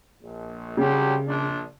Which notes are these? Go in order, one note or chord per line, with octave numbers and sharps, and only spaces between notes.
A#1
C2 C#3 F#3 G4
A#1 D4